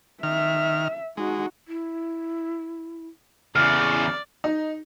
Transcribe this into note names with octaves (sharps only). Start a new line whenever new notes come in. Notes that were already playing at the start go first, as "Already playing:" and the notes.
D#3 E5 F6
G#3 D#4 F#4
E4
E2 C#3 E4 D5 F6
D#4